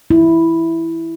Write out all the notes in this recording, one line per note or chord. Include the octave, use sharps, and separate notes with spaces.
E4